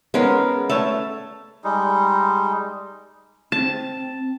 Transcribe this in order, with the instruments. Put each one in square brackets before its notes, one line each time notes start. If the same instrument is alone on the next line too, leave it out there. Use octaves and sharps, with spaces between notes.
[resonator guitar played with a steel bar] G#3 [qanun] B3 C#4 A#4
[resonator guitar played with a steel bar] A3 C#5 [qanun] A5
[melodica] G3 G#3 D#4
[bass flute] C4 [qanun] A5